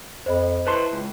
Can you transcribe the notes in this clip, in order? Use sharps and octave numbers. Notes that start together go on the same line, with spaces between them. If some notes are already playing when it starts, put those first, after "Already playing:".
F2 C5 D#5 B5
E4 B4 A5 C6
C#2